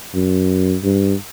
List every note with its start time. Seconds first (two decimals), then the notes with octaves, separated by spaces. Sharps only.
0.14 F#2
0.83 G2